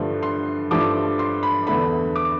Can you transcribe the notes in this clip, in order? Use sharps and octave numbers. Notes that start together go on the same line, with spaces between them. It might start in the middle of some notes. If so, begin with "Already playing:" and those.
Already playing: G2 D3 F3 A3
C6
G2 F3 A3 D6
C6
B5
E2 D3 A3 B5
D6